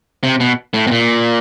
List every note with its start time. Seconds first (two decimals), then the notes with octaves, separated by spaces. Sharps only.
0.23 C3
0.40 B2
0.74 A2
0.87 B2
0.91 A#2